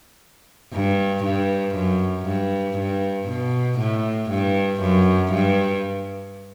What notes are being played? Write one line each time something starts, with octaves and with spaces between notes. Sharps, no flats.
G2
G2
F#2
G2
G2
B2
A2
G2
F#2
G2